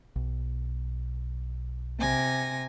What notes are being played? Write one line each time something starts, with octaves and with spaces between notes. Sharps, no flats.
B1
C3 G#5 A#6